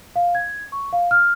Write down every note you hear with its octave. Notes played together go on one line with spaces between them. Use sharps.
F5
G#6
C#6
F5
F6